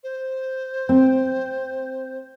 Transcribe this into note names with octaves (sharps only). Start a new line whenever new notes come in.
C5
C4